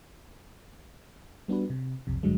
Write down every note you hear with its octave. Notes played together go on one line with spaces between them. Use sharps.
G3 B3 D4 F#4 B4
C3
B1 F2 C3
A1 G2 D3 F#3 G#3